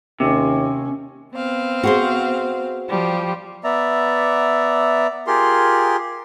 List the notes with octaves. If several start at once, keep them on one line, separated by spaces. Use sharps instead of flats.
D#2 C3 C#4
B3 C4 F5
F#4 G#4 C5
F3 G3 G4
B3 D5 E5 A#5
F4 G4 G#4 A#4 C6